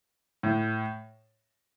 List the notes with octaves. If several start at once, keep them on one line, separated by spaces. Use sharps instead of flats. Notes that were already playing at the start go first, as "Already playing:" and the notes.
A2